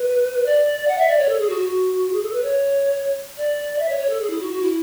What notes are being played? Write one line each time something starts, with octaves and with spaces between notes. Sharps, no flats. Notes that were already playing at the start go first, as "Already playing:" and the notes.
Already playing: B4
D5
F#5
E5
D5
C#5
A4
G#4
F#4
F#4
G#4
A4
B4
C#5
D5
E5
C#5
C#5
A4
G#4
E4
F#4
F#4
E4